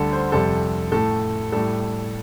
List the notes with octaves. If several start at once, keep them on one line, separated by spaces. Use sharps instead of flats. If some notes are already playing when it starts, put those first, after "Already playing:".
Already playing: D2 D3 G3 A4
C5
F2 C3 G3 A4
A2 A3 A4
A2 G3 A4